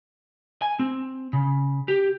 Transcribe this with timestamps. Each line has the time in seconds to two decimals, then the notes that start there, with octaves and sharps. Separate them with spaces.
0.62 G#5
0.79 C4
1.33 C#3
1.88 G4